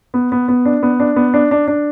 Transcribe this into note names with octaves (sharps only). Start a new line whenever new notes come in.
B3
B3
B3
D4
B3
D4
B3
D4
D4
D4